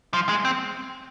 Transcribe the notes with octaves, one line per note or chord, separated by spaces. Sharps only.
F3
G#3
C4